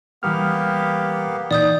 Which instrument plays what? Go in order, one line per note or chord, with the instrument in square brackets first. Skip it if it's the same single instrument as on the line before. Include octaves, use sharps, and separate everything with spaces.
[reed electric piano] E3 G3 F6 [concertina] A#3 B3 G4
[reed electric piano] A#2 E3 D#4 [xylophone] D5 D#6 G6